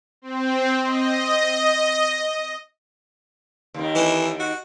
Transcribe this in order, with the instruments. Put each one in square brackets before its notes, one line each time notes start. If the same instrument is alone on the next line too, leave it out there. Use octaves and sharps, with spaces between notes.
[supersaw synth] C4
D#5
[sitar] D#2 D#3
[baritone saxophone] E3
F#4